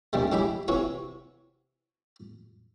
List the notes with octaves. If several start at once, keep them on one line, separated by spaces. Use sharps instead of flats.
A#1 D#2 G3 G#3
F#3 G#3 E4 G4 B5 D6
C3 E3 F#4 C#5 C#6